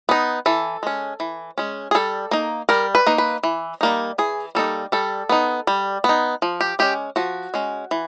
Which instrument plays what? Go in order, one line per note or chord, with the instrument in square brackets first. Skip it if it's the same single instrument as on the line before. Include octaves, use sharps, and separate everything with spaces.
[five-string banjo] B3 D#4
E3 A4
G#3 C#4
E3
G#3 C#4
G#4
G3 A4
A#3 D#4
G3 A#4
B4
A#3 D#4
B4
E3
G3 A#3 D#4
E3 G#4
G3 A#3 D#4 A4
G3 A4
B3 D#4
G3
B3
D#4
F3
G4
G#3 C#4 G4
F3 F#4
G#3 C#4
E3